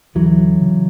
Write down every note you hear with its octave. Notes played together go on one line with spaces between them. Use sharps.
D2 E3 F#3
C#3
C#3